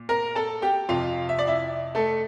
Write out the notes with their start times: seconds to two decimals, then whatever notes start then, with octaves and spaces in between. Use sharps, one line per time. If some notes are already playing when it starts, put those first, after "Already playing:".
Already playing: A#2
0.09 A#4 A#5
0.35 A4 A5
0.62 G4 G5
0.89 F2 C3 F3 F4 F5
1.29 E5
1.39 D5
1.47 E4 E5
1.95 A3 A4